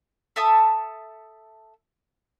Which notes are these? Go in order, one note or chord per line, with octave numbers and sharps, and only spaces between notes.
A4 E5 A5 D#6